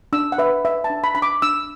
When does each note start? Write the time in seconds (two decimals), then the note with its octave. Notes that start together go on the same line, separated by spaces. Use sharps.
0.13 D4 E6
0.32 F#5
0.38 B4 E5
0.65 B4 E5
0.84 A5
0.90 D4
1.04 B5
1.15 D4 B5
1.22 D6
1.42 D4 E6